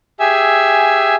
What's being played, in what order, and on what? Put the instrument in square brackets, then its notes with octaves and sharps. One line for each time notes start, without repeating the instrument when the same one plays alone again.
[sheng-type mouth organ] G4 G#4 E5 G#5 E6